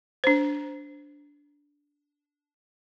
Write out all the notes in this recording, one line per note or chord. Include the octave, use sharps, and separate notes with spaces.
D4 C5